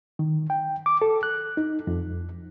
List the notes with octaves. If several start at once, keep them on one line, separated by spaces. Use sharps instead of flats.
D#3
G5
D6
A4
F#6
D#4
F2